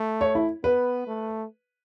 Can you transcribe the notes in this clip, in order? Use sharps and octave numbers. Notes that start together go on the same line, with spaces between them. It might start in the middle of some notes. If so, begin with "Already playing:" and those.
Already playing: A3
C#5
E4
B3 B4
A3